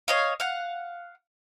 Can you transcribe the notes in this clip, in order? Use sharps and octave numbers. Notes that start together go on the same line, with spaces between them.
C#5 D#5 F5
F5 F#5